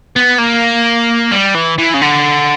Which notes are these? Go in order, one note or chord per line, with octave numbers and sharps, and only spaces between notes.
B3
A#3
G3
E3
E3
C#3
D3